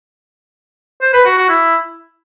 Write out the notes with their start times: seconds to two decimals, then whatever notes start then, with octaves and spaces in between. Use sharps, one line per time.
1.01 C5
1.13 B4
1.25 F#4
1.37 F#4
1.49 E4